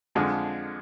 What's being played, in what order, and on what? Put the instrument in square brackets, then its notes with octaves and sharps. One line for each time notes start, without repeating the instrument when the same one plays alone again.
[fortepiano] F2 D3 F3 G#3